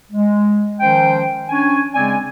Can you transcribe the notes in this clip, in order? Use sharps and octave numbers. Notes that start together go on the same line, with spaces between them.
G#3
D#3 F3 G#3 C#4 C5 G5
C#4 D4 G#5
C#3 G#3 C4 D5 G#5